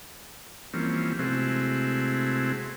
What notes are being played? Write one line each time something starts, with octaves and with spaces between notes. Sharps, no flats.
E3 F3 G3 A#3 C4 C#4
C3 G#3 A3 C4 E4 F#4